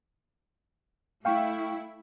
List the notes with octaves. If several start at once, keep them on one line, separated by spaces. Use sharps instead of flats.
A3 E4 F5 G5 C#6